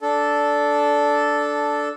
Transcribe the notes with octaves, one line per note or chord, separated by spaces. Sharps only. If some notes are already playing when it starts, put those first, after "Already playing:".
D4 A4